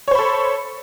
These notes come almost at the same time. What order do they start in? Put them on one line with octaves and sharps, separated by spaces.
C#5 C5 B5 A4